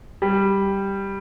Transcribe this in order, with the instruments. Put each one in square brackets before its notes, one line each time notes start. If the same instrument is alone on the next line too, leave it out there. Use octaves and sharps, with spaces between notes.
[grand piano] G3